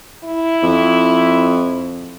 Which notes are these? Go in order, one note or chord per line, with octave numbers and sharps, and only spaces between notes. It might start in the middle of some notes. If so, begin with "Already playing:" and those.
E4
F2